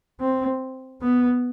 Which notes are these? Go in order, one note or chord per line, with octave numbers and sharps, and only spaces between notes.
C4
B3